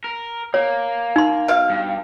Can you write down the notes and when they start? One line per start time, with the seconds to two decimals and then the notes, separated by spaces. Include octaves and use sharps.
0.04 A#4
0.54 A#3 C#5
1.16 D#4 C6
1.48 B2 F5
1.70 G2